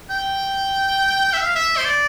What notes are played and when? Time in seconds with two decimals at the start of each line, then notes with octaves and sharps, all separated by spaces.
0.10 G5
1.33 E5
1.44 F5
1.55 E5
1.77 C5
1.85 D5